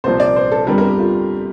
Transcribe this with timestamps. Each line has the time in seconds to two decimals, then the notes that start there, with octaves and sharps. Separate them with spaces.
0.04 C2 A#2 F3 C5
0.20 D5
0.36 C5
0.52 A4
0.67 G1 F2 D3 G3 A#4
0.78 A#4
0.88 G4
1.00 F4